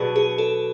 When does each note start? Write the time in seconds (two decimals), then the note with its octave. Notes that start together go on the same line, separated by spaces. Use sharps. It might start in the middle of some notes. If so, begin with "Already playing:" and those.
Already playing: B2 F#3 B3 D4 G#4
0.16 G#4
0.38 A4